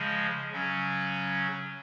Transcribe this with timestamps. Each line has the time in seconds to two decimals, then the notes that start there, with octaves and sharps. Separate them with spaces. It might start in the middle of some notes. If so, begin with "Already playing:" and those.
Already playing: C#3 F3 G#3
0.51 C#3 F#3 C#4